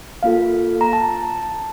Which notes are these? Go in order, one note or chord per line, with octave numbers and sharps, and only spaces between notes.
A#3 F4 A4 F5
A#5
A5